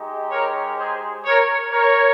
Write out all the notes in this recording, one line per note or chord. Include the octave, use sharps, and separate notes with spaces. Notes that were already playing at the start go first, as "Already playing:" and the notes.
Already playing: G#3 D#4 G4
A#4 C#5
G#4 C5
A#4 C#5
A#4 C#5